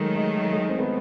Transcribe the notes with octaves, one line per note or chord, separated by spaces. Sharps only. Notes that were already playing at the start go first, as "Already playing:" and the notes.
Already playing: D#3 F#3 G#3 A3
G#3
G#3
C4
B3